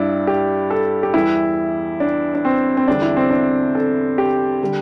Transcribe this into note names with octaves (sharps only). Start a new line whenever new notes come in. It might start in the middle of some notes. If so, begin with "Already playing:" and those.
Already playing: G2 G3 D4 E4
G4
A4
G4
E2 E3 G3 E4
D4
D4
C4
C4
E2 D3 G3 D4
E4
C4
D4
A4
G4
D3 G3